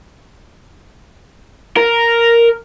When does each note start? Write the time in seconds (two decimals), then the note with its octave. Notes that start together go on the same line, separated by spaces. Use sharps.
1.77 A#4